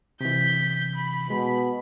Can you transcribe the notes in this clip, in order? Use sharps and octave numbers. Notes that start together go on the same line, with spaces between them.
C3 E3 G6 B6
B5
B2 G#3